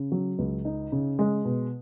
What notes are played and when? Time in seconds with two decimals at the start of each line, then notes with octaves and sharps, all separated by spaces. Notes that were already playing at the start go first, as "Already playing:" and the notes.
Already playing: C#3
0.12 F#3
0.39 C#2
0.65 D#4
0.92 C#3
1.19 G#3
1.45 B2